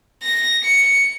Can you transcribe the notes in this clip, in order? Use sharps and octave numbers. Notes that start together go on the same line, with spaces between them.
A#6
C#7